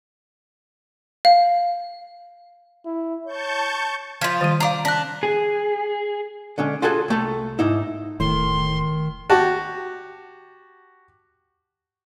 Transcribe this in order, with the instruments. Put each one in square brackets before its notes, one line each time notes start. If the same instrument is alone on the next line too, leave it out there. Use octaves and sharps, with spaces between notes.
[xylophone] F5
[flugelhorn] E4
[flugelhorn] C#5 [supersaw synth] A5 C#6 G6
[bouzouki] F3 F4 [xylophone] G#6 B6 F#7
[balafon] D#3 G3 [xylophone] A6 D#7
[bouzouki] D5 A#5 [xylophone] F5 C7
[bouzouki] D4 [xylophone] F#6 A#6 B6
[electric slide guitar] G#4
[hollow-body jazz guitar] D3 G#3 C#4
F4 F#4 G#4 A4 G#5
C2 A3 A4
G#2 D#4 E4
[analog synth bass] E1 [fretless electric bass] A2 [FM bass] D#3 [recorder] C6
[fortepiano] F#4 G4 A5